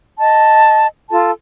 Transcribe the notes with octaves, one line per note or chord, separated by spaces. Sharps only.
D#5 A5
F4 A4 A5